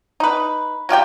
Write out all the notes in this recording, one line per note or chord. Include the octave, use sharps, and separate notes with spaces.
D#4 B4
F#3 F4 G4 G5